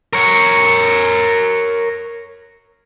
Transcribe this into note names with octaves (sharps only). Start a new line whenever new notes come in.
A#4 C#5